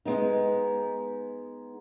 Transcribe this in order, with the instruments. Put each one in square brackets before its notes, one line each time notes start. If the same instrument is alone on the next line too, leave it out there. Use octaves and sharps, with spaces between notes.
[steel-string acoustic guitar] G#3 B3 D#4